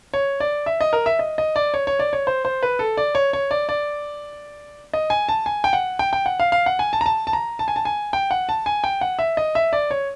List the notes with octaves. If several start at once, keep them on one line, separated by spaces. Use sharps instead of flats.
C#5
D5
E5
D#5
A#4
E5
D#5
D#5
D5
C#5
C#5
D5
C#5
C5
C5
B4
A4
D5
C#5
C#5
D5
D5
D#5
G#5
A5
G#5
G5
F#5
G5
G5
F#5
F5
F5
F#5
G#5
A5
A#5
A5
A5
A#5
A5
G#5
A5
G#5
G5
F#5
A5
G#5
G5
F#5
E5
D#5
E5
D5
C#5